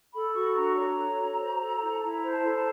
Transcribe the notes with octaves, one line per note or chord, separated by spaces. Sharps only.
A4 B5
F#4 C#6
D4 A#5
C#5 A#5
A4
F#4
C5
A4
E4
A5
E4 A#5
C5
A5
A4
A5